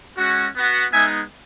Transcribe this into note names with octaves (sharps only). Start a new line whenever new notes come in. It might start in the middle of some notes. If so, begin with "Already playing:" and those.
G#3 C#4 F#4
B3 F#4
G#3 B3 D#4 E5 G#5